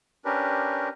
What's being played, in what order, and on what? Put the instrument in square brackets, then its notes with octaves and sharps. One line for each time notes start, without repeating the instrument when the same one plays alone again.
[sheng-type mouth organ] C#4 D4 G4 A#4 B4